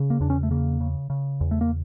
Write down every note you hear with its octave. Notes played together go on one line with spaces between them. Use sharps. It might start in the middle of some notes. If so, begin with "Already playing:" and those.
Already playing: C#3
A#3
E2 D4
C#4
A3
C#3 A#3
C#3
C#3
E2
A3
A#3